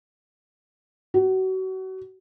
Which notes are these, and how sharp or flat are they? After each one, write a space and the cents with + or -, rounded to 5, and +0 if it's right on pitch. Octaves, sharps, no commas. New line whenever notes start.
F#4 +30